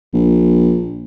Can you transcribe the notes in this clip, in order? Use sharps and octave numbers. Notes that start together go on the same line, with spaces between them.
A#1